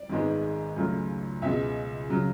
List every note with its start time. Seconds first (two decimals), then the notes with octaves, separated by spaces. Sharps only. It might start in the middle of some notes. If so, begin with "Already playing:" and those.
Already playing: D5
0.09 G#1 G#2 G#3 B3
0.76 C#2 C#3 F#3 A3
1.42 C#2 B2 G#3 E5
2.09 C#3 F#3